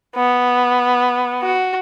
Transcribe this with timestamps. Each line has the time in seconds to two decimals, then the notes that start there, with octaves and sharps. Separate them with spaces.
0.16 B3
1.42 F#4